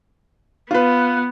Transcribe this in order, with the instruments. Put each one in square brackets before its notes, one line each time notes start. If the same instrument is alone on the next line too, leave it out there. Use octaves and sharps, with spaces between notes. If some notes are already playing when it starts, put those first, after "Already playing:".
[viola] B3 [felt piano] F4 B4